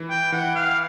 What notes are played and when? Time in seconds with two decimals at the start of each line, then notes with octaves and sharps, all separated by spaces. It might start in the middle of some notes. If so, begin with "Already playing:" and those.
Already playing: E3
0.10 G5
0.32 E3 F#5
0.55 F5